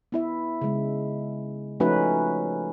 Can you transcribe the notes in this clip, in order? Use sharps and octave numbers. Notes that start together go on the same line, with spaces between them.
B3 E4 E5
C#3 G#3
F3 A3 C#4 D#4 F#4 B4